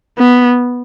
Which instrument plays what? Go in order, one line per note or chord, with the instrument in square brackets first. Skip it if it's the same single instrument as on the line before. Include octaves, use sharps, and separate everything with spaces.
[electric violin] B3